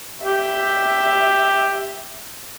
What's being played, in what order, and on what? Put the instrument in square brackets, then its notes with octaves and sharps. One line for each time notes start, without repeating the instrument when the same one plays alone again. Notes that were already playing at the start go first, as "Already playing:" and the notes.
[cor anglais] G4 [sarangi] E5